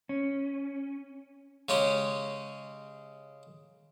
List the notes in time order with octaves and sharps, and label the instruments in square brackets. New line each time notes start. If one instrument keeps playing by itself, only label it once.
[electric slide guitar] C#4
[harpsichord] C#3 G#3 C#4 G4